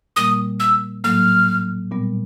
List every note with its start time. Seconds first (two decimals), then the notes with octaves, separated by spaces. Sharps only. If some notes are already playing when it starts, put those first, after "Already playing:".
0.16 A#2 G3 A#3 D#6
0.60 E6
1.04 A2 F#3 A#3 F6
1.92 A#2 G3 B3